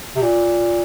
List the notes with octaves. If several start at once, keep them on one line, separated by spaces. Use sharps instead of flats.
C3
A#2